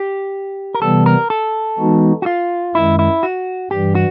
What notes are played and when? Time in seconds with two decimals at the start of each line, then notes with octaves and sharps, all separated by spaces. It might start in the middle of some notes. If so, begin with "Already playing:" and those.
Already playing: G4
0.75 A#4
0.82 C3 E3 G3 B3 A4
1.06 A#4
1.30 A4
1.78 E3 G#3 B3 D#4 F#4
2.22 F#4
2.26 F4
2.75 F#2 D#3 G#3 E4
2.99 E4
3.23 F#4
3.70 G2 E3 G3 G4
3.95 F#4